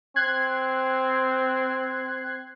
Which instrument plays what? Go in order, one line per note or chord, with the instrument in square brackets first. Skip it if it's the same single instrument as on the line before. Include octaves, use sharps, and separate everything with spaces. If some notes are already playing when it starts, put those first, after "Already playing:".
[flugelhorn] C4 [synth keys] F#6 G#6 C7